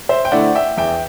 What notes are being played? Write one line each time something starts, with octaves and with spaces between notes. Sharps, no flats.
C5 E5
G5
D3 A3 E4 D5 F#5
E5 G5
E2 E5 G5